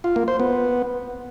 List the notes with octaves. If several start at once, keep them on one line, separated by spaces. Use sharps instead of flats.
F4
A#3
C5
B3